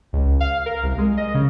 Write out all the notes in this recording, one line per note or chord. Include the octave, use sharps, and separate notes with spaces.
C#2
F5
A#4
C2
G#3
D#5
C#3